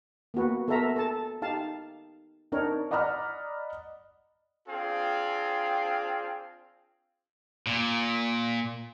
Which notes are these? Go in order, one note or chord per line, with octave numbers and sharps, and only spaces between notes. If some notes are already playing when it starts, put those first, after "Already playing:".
A#3 B3 F#4 B4
B3 A4 A#4 E5 A#5
A4 G#5 A5
D#4 G4 F5 A5
C4 D4 D#4 A#4 C#5
D5 D#5 F#5 A#5 B5 F6
C4 D4 F4 G#4 F5 G5
A#2